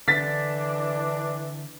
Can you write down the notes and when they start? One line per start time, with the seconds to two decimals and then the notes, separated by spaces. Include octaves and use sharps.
0.08 D3 E3 D4 A6 B6